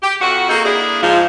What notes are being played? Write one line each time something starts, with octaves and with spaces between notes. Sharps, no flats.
G4
F2 F#4
A#3 D#4 F#4 G#4 A4
A#3 D4 E4 G#4
G#2 F3